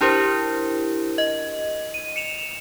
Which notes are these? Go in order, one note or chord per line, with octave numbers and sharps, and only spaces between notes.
D4 E4 G4 A#4 C5
D#5
D#7
C#7 E7 F7